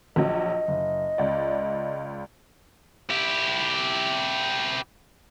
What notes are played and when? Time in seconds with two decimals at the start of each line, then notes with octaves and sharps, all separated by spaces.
0.16 A#1 F#3 D#5
0.68 F#1
1.18 C#2 D5
3.10 E4 G4